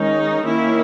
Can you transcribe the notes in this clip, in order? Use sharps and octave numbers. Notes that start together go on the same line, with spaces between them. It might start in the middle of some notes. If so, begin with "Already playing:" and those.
Already playing: D#3 G#3 C#4 D#4
D#3 A#3 C#4 E4